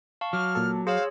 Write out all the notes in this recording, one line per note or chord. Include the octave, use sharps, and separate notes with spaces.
F5 A5 C#6
F#3 D6 F6
A#2 A4
G#4 C5 C#5 F5 E6